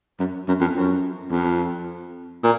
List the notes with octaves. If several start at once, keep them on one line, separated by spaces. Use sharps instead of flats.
F#2
F#2
F2
F#2
F2
A#2